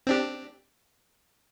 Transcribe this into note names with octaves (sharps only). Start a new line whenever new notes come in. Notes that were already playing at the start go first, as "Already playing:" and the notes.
C4 D4 G4